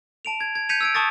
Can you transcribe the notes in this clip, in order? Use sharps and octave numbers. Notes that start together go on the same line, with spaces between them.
A5 D7 F7
G#6
G#6
G6 G#6 B6 C#7 D#7 F7
E6 G#6 D7
A5 C#6 D#6 A6